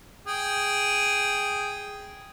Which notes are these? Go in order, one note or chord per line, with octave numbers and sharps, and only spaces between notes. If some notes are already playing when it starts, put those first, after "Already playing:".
G#4 G5